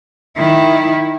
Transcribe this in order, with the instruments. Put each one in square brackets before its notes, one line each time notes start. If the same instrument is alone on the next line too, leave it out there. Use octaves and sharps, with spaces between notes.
[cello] D#3 E4